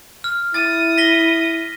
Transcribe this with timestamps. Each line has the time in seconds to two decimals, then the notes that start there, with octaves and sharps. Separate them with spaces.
0.24 F6
0.54 E4 D#6 A6
0.98 A#6 B6 G7